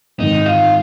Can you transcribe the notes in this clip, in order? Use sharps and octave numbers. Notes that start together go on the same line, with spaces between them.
G#1 G#2 D#3 D#4
F4